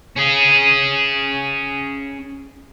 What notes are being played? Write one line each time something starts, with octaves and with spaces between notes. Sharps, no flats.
C#4 G#4